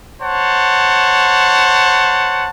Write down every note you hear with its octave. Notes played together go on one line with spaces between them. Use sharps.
C5 C#5 F#5 A5